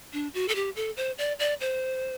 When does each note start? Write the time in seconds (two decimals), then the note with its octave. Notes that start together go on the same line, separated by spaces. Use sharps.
0.13 D4
0.34 F#4
0.48 A4
0.55 G4
0.76 A4
0.97 C5
1.18 D5
1.39 D5
1.60 C5